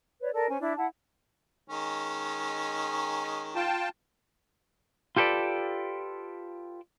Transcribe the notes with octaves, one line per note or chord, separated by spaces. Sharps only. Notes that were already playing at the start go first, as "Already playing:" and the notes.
B4 C#5 D5
A4 A#4 D5 A5
C#4 C5 G#5
D4 E4 E5
E4 F#5 A5
D#3 G#3 C#4
F4 G5 A5
F4 G4 A4 B4 D5